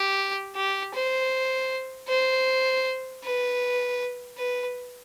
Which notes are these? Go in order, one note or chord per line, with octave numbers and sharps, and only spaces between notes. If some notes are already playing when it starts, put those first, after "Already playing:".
Already playing: G4
G4
C5
C5
B4
B4